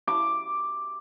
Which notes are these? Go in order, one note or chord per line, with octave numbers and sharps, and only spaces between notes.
D6